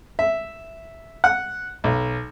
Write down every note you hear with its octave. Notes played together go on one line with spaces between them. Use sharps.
E5
F#5
B1